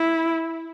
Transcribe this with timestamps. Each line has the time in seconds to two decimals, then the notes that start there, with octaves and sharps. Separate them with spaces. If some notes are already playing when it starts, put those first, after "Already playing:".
Already playing: E4